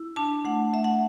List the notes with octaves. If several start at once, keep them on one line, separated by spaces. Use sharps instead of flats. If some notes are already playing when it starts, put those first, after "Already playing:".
Already playing: E4
D4 A5
A3 F#5
A3 E5
F#5